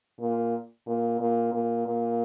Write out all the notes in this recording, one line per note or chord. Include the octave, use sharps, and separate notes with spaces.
A#2
A#2
A#2
A#2
A#2